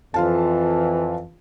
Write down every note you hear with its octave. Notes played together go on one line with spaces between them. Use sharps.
F2 E3 F4 F5 A5